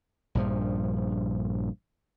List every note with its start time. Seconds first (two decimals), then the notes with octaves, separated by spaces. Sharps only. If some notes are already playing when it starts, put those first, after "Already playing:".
0.35 A#1 G2 F3